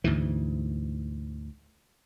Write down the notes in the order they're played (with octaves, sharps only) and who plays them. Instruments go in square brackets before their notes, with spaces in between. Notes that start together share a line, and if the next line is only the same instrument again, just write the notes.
[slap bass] D2 G#2 E3